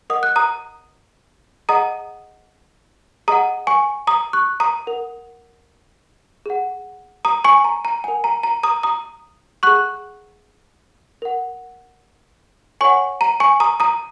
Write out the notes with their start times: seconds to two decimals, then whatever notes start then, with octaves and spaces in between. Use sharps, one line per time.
0.10 A#4 D#5 F#5 D#6
0.23 F#6
0.36 A#5 D#6
1.69 G#4 D#5 F#5 A#5 D#6
3.28 G#4 D#5 F#5 A#5 D#6
3.67 G#5 C#6
4.07 A#5 D#6
4.33 C#6 F#6
4.60 A#5 D#6
4.87 A#4 F#5
6.46 G#4 F#5
7.25 A#5 D#6
7.44 G#5 C#6
7.65 A#5
7.85 A#5
8.04 A#4 F#5 G#5
8.24 A#5
8.43 A#5
8.63 A#5 D#6
8.83 A#5 D#6
9.63 G#4 F#5 C#6 F#6
11.22 A#4 F#5
12.81 A#4 C#5 F#5 G#5 C#6
13.21 A#5
13.40 G#5 C#6
13.60 A#5 D#6
13.80 A#5 D#6